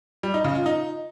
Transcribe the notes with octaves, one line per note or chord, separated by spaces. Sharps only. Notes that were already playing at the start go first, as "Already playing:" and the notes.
G3
D#4
C#3
F4
D#4